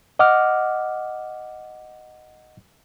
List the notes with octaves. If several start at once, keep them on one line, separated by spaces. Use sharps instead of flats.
D#5 F#5 D6 F6